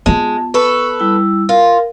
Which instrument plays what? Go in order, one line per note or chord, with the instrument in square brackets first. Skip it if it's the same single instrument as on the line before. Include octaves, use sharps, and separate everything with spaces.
[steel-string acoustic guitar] G#3 [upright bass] B3 F4 [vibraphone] A5
[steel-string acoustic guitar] A4 B4 [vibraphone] C#6
[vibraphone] G3 E4 E6
[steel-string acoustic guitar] F4 [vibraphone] A#4